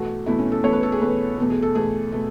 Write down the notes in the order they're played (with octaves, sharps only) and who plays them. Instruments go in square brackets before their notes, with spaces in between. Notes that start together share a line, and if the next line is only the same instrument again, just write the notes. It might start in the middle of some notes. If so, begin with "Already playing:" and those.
Already playing: [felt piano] E2 B2 A3 F#4
E2 B2 A3 E4
C#4
A4
E2 B2 A3 C#5
B4
A4
G#4
E2 B2 A3 B4
E2 B2 A3
G#4
A4
E2 B2 A3 G#4
B2 A3